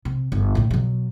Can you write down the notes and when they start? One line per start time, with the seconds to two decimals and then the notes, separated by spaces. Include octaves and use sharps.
0.05 C3
0.32 G1
0.55 A1 A2
0.71 B2 F#3